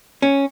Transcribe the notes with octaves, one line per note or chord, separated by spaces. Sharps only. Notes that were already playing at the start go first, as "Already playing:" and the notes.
C#4